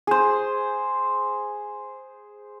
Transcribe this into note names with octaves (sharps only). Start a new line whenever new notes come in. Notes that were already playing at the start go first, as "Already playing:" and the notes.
G#4 C5